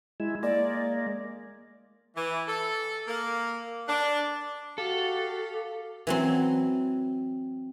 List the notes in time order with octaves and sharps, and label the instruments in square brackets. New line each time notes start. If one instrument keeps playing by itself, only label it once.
[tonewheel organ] G#3 E4
[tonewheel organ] G#3 A#3 [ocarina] D5
[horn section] E3
A4
A#3
D4
[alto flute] F#4 [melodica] G4 F5 [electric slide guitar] A4
[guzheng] E3 F#3 C4